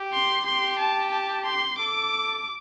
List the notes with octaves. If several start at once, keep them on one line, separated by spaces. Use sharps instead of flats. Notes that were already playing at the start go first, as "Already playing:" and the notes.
Already playing: G4
C6
G4 C6
A5
A5
C6
A4 D6